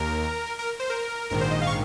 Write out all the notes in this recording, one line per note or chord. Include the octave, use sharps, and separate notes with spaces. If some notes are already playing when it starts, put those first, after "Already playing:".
Already playing: D#2 A#4
A#4
C5
A#4
A#1 G#2 D#3 A#4
C5
D#5
F5
C#6